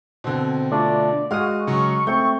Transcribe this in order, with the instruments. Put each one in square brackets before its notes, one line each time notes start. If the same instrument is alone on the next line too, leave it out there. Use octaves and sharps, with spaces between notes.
[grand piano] B2 D3 [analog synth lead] C4
[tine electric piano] A3 D4 F4 [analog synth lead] D5
[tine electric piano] G#3 D#6 [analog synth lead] F#4 [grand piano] F5 F6
[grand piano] C#3 F#3 [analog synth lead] C#6
[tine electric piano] A3 C4 [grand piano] G6